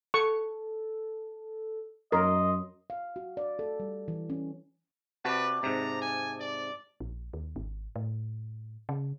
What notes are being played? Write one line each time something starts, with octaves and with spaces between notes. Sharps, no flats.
A4 C#6
F#2 A#4 D#5 C6
F5
F#4
D5
A4
G3
E3
C#4
C3 F#4 B4 D5 A5
G#2 C3 A#5
G#5
D5
A#1
D#2
G#1
A2
C#3